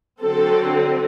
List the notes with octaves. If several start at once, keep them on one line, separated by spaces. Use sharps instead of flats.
D3 F#3 C4 A4